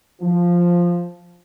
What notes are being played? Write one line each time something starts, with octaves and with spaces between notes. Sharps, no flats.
F3